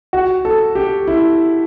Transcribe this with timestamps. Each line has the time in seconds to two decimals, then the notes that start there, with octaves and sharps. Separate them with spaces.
0.13 F#4
0.45 A4
0.75 G4
1.07 E4